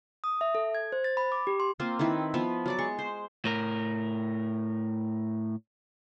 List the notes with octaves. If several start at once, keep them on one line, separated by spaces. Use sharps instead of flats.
D#6
E5
A4
G#6
C5
A6
B5
D6
G4
C6
A#3 C4 F4 C5
D#3 C4 E4 B4
F3 B3 B4
F#3 D5 D6
G#3 C#6
C5
A2 A#4